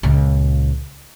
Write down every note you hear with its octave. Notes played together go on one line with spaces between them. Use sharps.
C#2 A#2